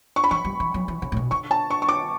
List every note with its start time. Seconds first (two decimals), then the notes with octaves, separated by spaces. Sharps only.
0.16 C#6
0.24 B5
0.31 E3 C#6
0.45 G3
0.60 E3
0.74 F#3
0.88 E3
1.02 C#3
1.12 A2
1.17 B2
1.31 D3 C#6
1.51 A5
1.70 C#6
1.82 C#6
1.89 D6